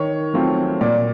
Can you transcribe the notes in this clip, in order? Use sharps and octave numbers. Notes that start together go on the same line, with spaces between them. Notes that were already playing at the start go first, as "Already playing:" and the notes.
Already playing: D#3 C#5
F#3 A3 C4 F4
A#2 D5